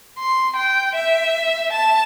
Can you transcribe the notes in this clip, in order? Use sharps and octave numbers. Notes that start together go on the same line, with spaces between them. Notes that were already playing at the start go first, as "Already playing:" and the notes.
C6
G5
E5
A5